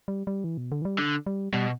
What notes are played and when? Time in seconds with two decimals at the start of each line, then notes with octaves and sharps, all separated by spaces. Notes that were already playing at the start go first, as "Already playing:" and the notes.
0.08 G3
0.27 G3
0.44 E3
0.58 B2
0.72 D3
0.82 E3
0.85 G3
0.99 D3
1.26 G3
1.53 B2 G3